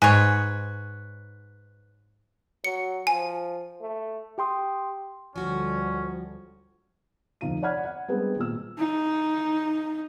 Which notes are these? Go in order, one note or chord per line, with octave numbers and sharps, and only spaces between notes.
G#2 B4 C#5 G#5
F#3 C#7
F3 G#5
A3
G4 G5 C6 D#6
D2 D3 F3 G3 C#4 F#4
F1 D2 F3 D#4 F5 D#7
C#5 D5 F#5 B5 F6 G#6
F#5
G3 G#3 B3 C4 D4
G#1 A#2 E6
D#4